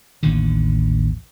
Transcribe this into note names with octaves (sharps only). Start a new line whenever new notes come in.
A1 D#2 D3